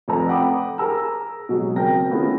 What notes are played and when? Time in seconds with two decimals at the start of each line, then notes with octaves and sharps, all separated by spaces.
0.08 F1 F2 A4 B4 A#5
0.29 F#5 G5 B5 D6 D#6
0.78 G#4 A#4 A#5 E6
1.49 B2 F#3 G#3
1.76 F#1 C4 A#4 G5 A#6
2.10 A3 B3 C#4 E4 F4 G#4